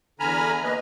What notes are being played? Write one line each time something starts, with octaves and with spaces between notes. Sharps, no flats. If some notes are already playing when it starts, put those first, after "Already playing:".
E2 D3 G#5 A#5 B5 F6
A#3 B4 D#5